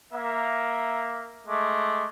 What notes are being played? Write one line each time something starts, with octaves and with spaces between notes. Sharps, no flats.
A#3 E5
G#3 A3 D6